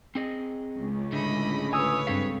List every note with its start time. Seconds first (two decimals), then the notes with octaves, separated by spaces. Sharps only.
0.15 C4 G#4 D#5
0.72 C#2 C#3
1.12 A2 D3 A3 D#5 B5
1.73 B4 C#5 G#5 D#6 E6
2.07 G2 C4 A4 F5 B6